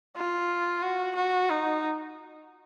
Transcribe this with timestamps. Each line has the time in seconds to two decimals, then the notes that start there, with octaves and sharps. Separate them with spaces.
0.16 F4
0.82 F#4
1.16 F#4
1.50 D#4